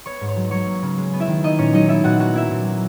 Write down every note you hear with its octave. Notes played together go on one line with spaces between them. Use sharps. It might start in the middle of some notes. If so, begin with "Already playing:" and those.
B3 C#5 C#6
G#2
C#5 C#6
F#3
F#3 C#5 C#6
A#3
C#3
G#3
B3
E4 E5
D#3
A#3 D#4 D#5
A#2 C#4 C#5
F#3 D#4 D#5
B3 E4 E5
A#2 F#4 F#5
F#3 F#4 F#5
A#3 E4 E5
A#2
F#3